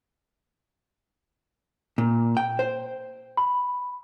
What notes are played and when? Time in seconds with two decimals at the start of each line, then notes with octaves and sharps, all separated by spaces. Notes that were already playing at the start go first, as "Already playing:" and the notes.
1.98 A#2
2.37 G5
2.59 C5
3.37 B5